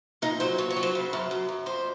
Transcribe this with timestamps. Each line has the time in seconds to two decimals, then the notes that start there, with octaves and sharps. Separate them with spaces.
0.22 A#2 D#4
0.40 F#3 C5
0.58 A#2 C#5
0.70 C#5
0.76 F#3
0.83 C5
0.95 C#3
1.13 F#2
1.31 F#2
1.49 F#2
1.66 F2 C5